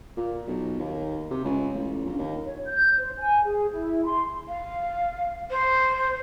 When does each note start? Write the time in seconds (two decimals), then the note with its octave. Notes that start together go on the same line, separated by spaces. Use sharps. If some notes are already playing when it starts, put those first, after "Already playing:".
0.17 A#2
0.47 B1
0.79 D#2
1.31 C3
1.44 C#2
1.74 A1
2.05 A#1
2.18 D#2
2.43 C#5
2.66 G6
2.98 C5
3.18 G#5
3.44 G#4
3.73 E4
4.05 C6
4.48 F5
5.50 C5